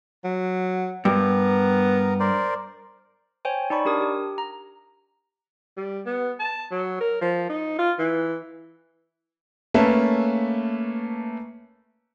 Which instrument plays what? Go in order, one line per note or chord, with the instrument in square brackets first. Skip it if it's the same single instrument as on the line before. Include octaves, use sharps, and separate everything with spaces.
[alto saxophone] F#3
[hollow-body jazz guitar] G2 [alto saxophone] B3 [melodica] A#4 A#5
[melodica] A#4 C5 D5
[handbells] C5 C#5 G5 G#5
D#4 D5 A5 B5 C#6
D4 G4 A#4 D#6
G4
A#5
[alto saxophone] G3
B3
A5
F#3
A#4
F3
D#4
F4
E3
[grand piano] A3 A#3 C#4 B4 E5 A5